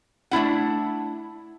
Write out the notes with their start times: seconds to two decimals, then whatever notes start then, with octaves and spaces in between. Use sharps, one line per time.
0.31 A3 D4 E4 F#5